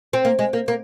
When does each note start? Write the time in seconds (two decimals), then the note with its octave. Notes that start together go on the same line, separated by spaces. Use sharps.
0.13 C4
0.25 A#3
0.39 G#3
0.53 A#3
0.68 A#3